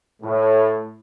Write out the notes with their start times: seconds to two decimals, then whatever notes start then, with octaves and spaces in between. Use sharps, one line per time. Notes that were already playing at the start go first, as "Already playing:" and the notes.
0.22 A2